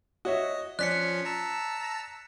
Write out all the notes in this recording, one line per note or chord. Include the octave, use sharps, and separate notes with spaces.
F#4 C#5 D#5 E5
F3 C#4 D5 F#6 B6 C#7
A5 A#5 E6